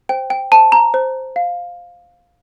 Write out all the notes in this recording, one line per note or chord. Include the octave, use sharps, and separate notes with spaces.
C5 G5
G5
C5 A5
A#5
C5
F5